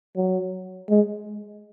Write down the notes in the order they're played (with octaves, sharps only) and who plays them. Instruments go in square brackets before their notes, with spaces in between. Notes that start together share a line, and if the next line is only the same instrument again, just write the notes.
[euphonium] F#3
G#3